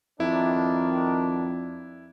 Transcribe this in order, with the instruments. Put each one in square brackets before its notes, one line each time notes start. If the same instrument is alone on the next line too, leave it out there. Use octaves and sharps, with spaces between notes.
[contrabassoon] F2 [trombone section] D#3 D4 [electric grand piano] E4